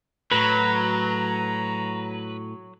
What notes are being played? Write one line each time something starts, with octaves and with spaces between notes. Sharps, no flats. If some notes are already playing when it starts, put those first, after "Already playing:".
A2 F#3 B4 A#5